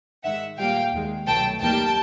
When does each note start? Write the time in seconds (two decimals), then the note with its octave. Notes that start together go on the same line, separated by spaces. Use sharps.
0.24 G#2 D#3 G#3 E5 F#5
0.58 A#2 G3 A#3 F5 G5
0.92 D#2 D#3 G#3
1.26 C2 B2 F#3 A3 G5 A5
1.61 D#2 D#3 G3 A#3 G5 A5